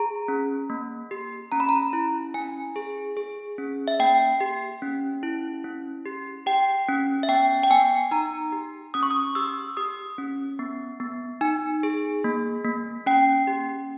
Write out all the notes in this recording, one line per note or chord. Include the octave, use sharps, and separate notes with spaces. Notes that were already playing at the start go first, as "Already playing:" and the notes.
Already playing: G#4 A#5
C#4
A#3
G4
C#4 A#5
B5
A#5
E4
C#4 G#5
G#4
G#4
C#4
E5
A#3 G5
G4
C#4
E4
C#4
G4
G4 G5
C#4
E5
B3 G5
G5
B3 G#5
D#4 A#5
G4
C#4 D#6
C#6
D#6
G4 E6
G4 D#6
C#4
B3
B3
D#4 G#5
G#4
A#3
A#3
C#4 G5
G4